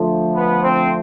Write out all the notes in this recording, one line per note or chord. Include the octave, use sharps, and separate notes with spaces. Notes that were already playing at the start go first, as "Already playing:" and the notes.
Already playing: D3 F3 A3
B3
C4